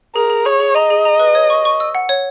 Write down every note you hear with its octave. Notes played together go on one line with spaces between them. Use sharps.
G#4 A#4
G#4
G#4 C#5
G#4
D#5 A#5
G#4
A#5
B4
C#5
C#6
C#6
E6
F#5
C#5